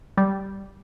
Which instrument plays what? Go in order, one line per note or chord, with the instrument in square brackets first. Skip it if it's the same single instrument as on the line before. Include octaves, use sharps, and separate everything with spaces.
[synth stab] G3